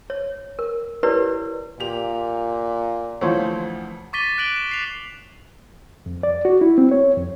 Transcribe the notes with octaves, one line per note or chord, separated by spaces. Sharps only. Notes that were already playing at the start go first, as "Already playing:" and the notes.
C#5
A#4
E4 G4 A#4 B4 C#5 D5
A#2 G4 F7
D2 E3 F3 F4 C5 C#5
C#6 D6 A6 B6 D#7 G7
F#6 D7 F#7 G7
E7
C7 F7
F2
D5
F#4
E4
C4
C#5
F2